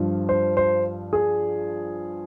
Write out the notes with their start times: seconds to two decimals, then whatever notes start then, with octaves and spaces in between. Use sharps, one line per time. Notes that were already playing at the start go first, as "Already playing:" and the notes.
Already playing: G2 F3
0.29 C5
0.57 C5
1.13 G#4